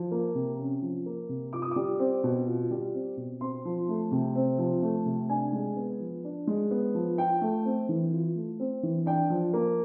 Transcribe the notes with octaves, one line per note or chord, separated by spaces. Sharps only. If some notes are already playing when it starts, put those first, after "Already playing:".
Already playing: F3
A#3
C3
C#4
F3
A#3
C3
F4 D6
D#6
G3 D6
C4
B2
F4
G3
C4
B2
C4 C6
F3
A3
C3
C4
F3
A3
C3
D4 G#5
G#3
B3
F3
D4
G#3
B3
F3
F4 G5
A3
C4
E3
F4
A3
C4
E3
D4 G5
F3
A#3